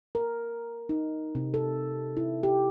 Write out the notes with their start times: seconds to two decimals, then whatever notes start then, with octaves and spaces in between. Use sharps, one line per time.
0.15 A#4
0.89 D#4
1.35 C3
1.54 A4
2.17 E4
2.43 G4